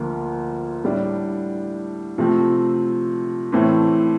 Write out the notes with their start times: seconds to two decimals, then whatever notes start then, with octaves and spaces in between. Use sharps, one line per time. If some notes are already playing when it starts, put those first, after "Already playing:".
Already playing: D2 D3 F3 A#3 F4
0.84 A2 G3 D4
2.18 C3 F3 A3 C4
3.52 A2 E3 A3 C4